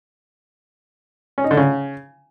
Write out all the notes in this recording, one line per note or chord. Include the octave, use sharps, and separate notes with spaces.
C#4
D#4
D3
C#3